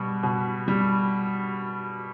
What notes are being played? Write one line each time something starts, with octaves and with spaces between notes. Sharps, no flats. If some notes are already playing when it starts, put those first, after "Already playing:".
Already playing: B2 G3
B2
G3